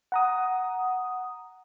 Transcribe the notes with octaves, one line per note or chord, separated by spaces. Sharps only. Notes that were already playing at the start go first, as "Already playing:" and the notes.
F#5 A#5 D#6